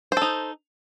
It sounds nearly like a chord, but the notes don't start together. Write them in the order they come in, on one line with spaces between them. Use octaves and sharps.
C5 A4 D#4